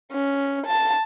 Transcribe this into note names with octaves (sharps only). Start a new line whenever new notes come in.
C#4
A5